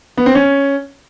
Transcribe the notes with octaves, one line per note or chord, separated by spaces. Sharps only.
B3
C4
C#4